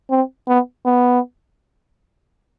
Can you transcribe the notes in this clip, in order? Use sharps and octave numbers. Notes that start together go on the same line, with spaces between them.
C4
B3
B3